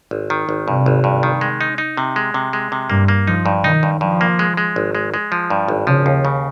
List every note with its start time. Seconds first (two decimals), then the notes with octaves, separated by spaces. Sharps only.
0.11 G#1
0.30 D#3
0.49 G#1
0.68 G2 C3
0.86 G#1
1.04 G2
1.23 D#3
1.41 G#3
1.61 D#4
1.78 D#4
1.97 C3
2.16 G#3
2.34 C3
2.53 G#3
2.72 C3
2.90 G2 A#3
3.08 A#3
3.27 F3 D#4
3.46 G2
3.64 D#3 D#4
3.83 G2
4.01 G2 F3
4.21 A#3
4.39 G#3
4.57 G#3
4.76 G#1
4.95 G#3
5.14 G#3
5.32 F3
5.50 G2
5.68 G#1
5.87 C#3 F3
6.06 D#2
6.25 C#3